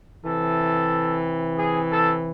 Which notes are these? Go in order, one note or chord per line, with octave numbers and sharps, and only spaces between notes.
C3 E3 A4
G#4
A4